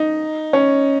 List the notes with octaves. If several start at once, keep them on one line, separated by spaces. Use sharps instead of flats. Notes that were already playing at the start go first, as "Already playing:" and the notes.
Already playing: D#4
C#4